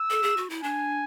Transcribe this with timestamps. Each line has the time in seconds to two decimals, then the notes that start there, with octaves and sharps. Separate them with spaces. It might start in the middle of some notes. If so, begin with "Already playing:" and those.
Already playing: E6
0.10 A4
0.23 G#4
0.37 F#4
0.50 E4
0.63 D4 G#5